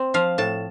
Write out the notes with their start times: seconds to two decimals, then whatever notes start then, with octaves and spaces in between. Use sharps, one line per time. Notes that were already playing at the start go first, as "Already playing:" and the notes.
Already playing: C4
0.14 F3 F5
0.38 A2 A5